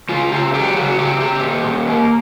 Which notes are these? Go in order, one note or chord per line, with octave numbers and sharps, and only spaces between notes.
C#3 F4
C#3 G4
F#3 G4
C#3 F#4
C#3 G4
C#3 G4
A#2
A#2
A#3